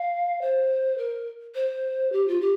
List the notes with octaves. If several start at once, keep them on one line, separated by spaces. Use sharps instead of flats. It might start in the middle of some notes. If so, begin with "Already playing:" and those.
Already playing: F5
C5
A#4
C5
G4
F4
G4